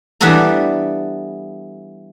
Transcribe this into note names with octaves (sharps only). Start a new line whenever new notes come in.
E3 G3 B3 D4 A4 A#5